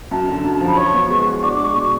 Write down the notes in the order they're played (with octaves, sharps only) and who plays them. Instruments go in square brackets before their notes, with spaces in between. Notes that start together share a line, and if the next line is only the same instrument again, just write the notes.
[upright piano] F#2 [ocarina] A5
[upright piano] D3
F#2
[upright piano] F3 [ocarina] A5
[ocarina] B5
[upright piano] C#5 [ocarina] C#6
[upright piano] B3
G#3
F#4
[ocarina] C#6
[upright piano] D4 [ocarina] D6
[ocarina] D6
[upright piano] G#3 [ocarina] C#6
[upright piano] B2 [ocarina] C#6